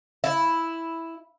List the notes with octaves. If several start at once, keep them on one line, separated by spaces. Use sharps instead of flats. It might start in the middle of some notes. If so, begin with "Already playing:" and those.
E4